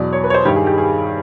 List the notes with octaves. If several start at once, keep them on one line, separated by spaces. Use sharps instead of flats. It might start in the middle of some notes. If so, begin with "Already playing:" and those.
Already playing: E2 B2 F#3 D5
C#5
B4
C#5
C5
G2 D#3 G3 G4
G#4
G4
G#4